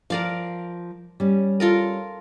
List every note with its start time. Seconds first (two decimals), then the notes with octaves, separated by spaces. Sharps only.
0.10 F3 A#4 D5 F5
1.20 G3 C#4
1.60 F4 A4 A#4